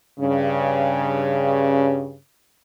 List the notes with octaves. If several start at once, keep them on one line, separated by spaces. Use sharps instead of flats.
G2 C#3 C#4